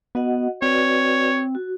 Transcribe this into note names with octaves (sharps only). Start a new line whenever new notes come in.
B3 F#4 D#5 F#5
C4 F#4 B4 C#5 D5
F#4